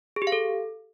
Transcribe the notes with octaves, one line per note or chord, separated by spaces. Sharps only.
G#4
G4
F5
A4